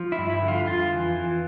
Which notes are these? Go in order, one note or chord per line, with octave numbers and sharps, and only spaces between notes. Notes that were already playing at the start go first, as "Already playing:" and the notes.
Already playing: F3
E4
G2
E4
D3
F4
F2 F4
E3
E3